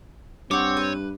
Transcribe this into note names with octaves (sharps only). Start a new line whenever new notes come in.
G2 C4 C#5 F#5 D6
B4